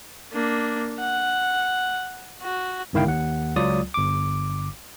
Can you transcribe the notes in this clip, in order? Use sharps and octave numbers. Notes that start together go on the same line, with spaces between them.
A#3 D4
F#5
F#4
G1 C#2 D#3 E4 F5 G5
D#2 F#5
C#2 F#3 F4 D5 D#6
G1 D6